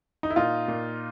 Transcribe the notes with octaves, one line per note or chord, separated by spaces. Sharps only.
D#4
E4
A#2 D#4 F4
A#2